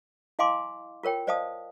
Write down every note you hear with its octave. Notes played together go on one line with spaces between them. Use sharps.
E4 D#5 F5 G#5 C6 D6
F4 A#4 C#5 G5
C5 D5 D#5 F5 A5 D#6